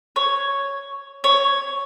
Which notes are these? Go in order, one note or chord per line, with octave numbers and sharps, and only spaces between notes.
C#5
C#5